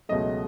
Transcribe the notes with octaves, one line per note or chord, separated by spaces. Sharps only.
C#2 B2 F#3 A3 D#5